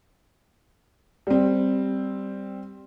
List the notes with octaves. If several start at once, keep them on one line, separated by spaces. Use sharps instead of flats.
G3 C4